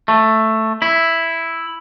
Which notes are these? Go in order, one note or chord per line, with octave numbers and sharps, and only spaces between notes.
A3
E4